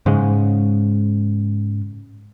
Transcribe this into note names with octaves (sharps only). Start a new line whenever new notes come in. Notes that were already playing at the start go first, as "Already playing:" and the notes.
G#2 C#3 G#3